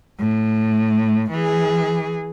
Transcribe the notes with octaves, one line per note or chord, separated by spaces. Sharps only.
A2
E3 G#4